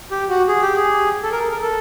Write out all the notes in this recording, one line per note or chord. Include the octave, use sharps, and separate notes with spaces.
G4
F#4
G#4
G4
G#4
A4
A#4
A#4
A4